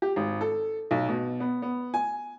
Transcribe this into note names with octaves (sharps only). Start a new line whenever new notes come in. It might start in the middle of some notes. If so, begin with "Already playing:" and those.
G4
G#1
A4
B1
B2
B3
B3
G#5